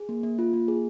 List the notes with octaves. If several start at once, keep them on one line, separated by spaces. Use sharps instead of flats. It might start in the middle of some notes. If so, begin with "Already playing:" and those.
Already playing: G#4
A#3
A#3
F4
A#3
G#4